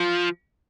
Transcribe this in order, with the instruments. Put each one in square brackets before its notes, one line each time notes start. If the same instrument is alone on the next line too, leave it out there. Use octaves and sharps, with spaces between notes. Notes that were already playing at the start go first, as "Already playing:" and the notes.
Already playing: [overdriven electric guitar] F3